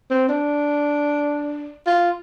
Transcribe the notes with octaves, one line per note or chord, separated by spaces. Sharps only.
C4
D4
F4